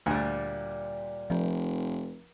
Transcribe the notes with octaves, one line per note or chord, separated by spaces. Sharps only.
D2 A#2 G3
F1 F3